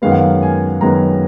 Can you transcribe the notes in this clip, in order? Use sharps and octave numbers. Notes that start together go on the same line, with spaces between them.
F#2 D#3 G#3 B3 F5
F#5
F5
G#5
F#2 D#3 G#3 B3 A#5